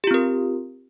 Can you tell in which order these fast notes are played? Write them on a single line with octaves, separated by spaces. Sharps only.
G4 F4 C4 A#4